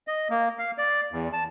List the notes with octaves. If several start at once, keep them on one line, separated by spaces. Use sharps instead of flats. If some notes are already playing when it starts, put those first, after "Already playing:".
D#5
A#3
F5
D5
E2
A5